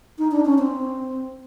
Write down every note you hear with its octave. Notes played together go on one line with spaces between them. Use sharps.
D#4
D4
C#4
C4